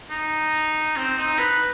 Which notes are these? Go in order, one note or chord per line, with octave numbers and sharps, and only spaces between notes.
D#4
C4
D#4
B4